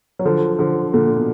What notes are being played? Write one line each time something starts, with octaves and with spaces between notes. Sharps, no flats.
F#3
D3 F3
D3 F3
A#2 D3
B2